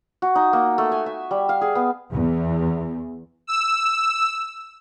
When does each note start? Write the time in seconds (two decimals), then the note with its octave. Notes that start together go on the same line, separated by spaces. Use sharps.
0.22 F#4
0.35 D#4
0.53 A#3
0.78 A3
0.92 G#5
1.06 E5
1.31 G3
1.49 F5
1.61 G#4
1.75 B3
2.13 E2
3.47 E6